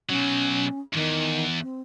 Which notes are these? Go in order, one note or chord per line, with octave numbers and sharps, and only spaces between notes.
B2 F#3 C#4
E2 G2 D#3
C4